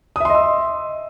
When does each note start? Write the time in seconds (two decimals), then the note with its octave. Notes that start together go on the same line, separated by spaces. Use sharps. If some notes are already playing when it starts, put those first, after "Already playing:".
0.16 D#6
0.20 E5
0.25 C6
0.30 D#5
0.35 E6